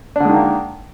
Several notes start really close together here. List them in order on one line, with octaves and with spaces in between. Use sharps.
D4 D3 G#3 D#3 A#3